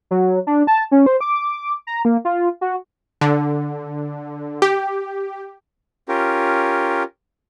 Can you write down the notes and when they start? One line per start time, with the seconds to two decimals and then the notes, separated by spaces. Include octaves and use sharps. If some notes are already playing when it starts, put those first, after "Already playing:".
0.11 F#3
0.47 D4
0.67 A5
0.92 C#4
1.06 C5
1.21 D6
1.87 A#5
2.05 A#3
2.25 F4
2.61 F#4
3.21 D3
4.62 G4
6.08 C#4 F4 G4 A#4